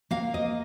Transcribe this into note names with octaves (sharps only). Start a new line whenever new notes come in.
A#3 F5
D#5